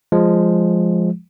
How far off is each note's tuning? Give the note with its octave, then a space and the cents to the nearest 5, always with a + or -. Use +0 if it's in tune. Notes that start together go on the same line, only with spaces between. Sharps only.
F3 +0 G#3 -5